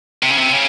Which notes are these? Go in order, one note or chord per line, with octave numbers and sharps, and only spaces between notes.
C3
C#3
C3
C#3